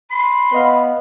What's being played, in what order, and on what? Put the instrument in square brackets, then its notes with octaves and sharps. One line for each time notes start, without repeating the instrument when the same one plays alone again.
[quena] B5 [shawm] C6
[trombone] B3 [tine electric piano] B4 D#5 F5